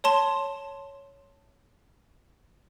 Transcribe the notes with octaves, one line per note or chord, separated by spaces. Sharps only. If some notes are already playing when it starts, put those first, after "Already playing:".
C#5 A5 C6 E7